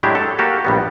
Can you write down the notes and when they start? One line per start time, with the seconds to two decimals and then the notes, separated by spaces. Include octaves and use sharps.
0.03 A2 F#3 G#3 D4 E4 G4
0.15 A4
0.38 A#3 F#4 G4 A4 F5
0.65 A#1 G3 B3